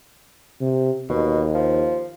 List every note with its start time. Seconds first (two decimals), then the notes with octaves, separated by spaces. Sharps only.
0.61 C3
1.09 D#2 B2
1.55 F3